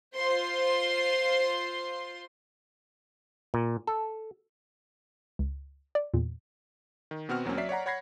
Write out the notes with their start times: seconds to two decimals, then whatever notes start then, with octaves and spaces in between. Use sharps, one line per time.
0.14 F4 C5 C6
3.54 A#2
3.87 A4
5.39 C#2
5.95 D5
6.14 E2 A#2
7.11 D#3
7.29 B2 B3 C4 F#4 F6
7.45 E2 F#3 A#3 C4 C#4
7.57 F#3 D5 E5 B6 C7
7.69 C#5 D5 F#5 A#5
7.86 C#5 F#5 B5 G#6 A#6 C7